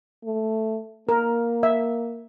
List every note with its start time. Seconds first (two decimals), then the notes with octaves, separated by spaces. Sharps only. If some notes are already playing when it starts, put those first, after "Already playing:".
0.25 A3
1.09 A#3 A#4
1.63 E5